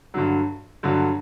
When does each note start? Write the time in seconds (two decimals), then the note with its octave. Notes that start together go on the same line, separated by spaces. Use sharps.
0.14 G2 D3 F#3
0.83 G2 D3 F#3